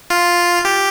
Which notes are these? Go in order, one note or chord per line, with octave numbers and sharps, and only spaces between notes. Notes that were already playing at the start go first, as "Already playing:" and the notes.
F4
G4